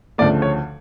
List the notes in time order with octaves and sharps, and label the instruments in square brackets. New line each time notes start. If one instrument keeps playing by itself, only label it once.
[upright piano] D2 C#3 F3 A3 [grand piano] D5
[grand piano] C#5